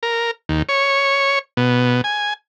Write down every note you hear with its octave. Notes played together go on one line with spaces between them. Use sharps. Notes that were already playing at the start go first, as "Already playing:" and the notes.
A#4
D#2
C#5
B2
G#5